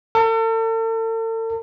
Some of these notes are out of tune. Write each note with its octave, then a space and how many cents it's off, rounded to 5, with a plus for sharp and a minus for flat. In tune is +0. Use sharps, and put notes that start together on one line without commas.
A4 +40